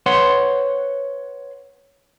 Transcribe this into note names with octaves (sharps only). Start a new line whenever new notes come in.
B4 C#5 F#5 C6